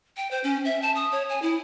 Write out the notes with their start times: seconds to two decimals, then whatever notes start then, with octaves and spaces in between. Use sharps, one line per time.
0.17 G5
0.31 C5
0.44 C#4
0.65 E5
0.82 A5
0.95 D#6
1.12 C#5
1.29 G#5
1.42 E4